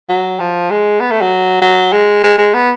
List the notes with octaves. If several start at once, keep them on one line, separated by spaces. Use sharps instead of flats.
F#3
F3
G#3
B3
A3
F#3
F#3
G#3
G#3
G#3
B3